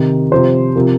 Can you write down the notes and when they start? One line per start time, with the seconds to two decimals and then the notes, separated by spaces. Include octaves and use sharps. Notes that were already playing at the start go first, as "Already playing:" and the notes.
Already playing: C3 D#3
0.31 C3 F3 C5
0.76 C3 F3 A#4